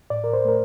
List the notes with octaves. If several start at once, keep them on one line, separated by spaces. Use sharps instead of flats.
A2 D5
A#4
C5
A3 A#4